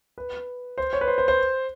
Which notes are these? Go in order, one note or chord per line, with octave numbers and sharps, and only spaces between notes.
B4
C5
C#5
B4
C5
C5
C5